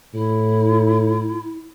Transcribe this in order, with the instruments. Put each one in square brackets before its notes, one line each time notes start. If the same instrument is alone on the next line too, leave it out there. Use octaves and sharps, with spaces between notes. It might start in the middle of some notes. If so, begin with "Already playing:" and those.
[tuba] A2 [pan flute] E4